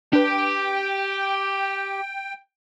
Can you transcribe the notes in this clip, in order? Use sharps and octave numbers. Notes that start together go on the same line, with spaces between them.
D4 G4 B4 G5